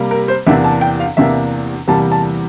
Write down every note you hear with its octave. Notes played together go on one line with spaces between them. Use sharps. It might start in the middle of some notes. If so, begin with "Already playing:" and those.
Already playing: C3 G3 A#3
A#4
C5
E2 C3 E3 A#3 D4 E5
A5
G5
F5
E2 C3 E3 A#3 D4 E5
E2 C3 E3 G3 A#3 A5
A5